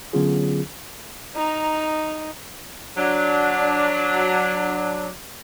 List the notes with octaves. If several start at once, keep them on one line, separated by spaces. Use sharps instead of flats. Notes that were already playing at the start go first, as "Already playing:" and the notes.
D3 F#3 B3 C#4 F4 G#4
D#4 A#5
F#3 D4